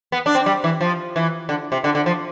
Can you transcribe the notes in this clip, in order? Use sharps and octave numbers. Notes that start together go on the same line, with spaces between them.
B3
D4
C4
G3
E3
F3
E3
D3
C3
D3
D3
F3